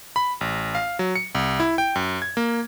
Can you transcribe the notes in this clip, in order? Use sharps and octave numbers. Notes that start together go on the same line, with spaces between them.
B5
A1
F5
F#3
C#7
C2
E4
G5
F#2
G#6
A#3